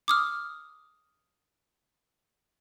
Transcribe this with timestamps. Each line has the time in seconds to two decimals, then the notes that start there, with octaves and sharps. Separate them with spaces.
0.08 D6 D#6 F6